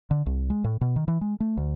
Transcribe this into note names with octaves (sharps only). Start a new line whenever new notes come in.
D3
C2
G#3
A2
B2
D#3
E3
G#3
A3
D2